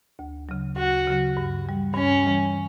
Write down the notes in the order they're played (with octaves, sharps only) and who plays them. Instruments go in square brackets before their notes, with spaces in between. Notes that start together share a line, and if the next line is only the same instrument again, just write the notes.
[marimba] D2
C#3 F#3
[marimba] D2 [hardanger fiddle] F#4
[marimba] C#3 F#3
G2
E3 G3
[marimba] G2 [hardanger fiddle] C#4
[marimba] E3 G3